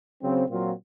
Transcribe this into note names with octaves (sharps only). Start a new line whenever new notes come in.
C#3 F#3 C4
A#2 F#3 C4 F4